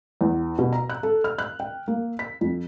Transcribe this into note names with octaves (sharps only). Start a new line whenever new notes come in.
E2
B2
A#5
F#6
A4
F6
F#6
G5
A#3
B6
F2